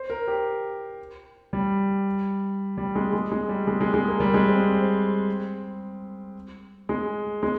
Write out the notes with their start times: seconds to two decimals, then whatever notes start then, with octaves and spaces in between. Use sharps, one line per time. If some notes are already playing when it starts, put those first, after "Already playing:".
Already playing: C5
0.10 A#4
0.28 G4
1.53 G3
2.77 G3
2.95 G#3
3.13 G#3
3.31 G#3
3.49 G3
3.67 G#3
3.81 G#3
3.94 G#3
4.07 A#3
4.20 G3
4.34 G#3
4.48 C4
4.61 C4
4.74 C4
6.89 G#3
7.43 G#3